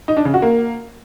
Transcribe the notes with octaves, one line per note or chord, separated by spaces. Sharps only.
D#4
D4
C#3
F#4
A#3